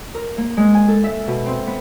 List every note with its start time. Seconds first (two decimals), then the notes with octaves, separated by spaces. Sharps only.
0.14 A#4
0.38 A#3
0.57 G#3
0.74 G#5
0.88 A4
1.04 E5
1.28 B2
1.46 C4
1.67 B3